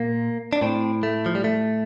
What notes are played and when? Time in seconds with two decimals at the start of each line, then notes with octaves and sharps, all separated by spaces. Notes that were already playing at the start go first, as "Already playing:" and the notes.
Already playing: A#2 A#3
0.53 D4
0.61 A2 C4
1.03 A3
1.26 F3
1.35 G3
1.44 A3